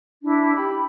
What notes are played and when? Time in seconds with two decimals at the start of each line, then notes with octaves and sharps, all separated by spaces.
0.23 D4 E4
0.55 G4 B5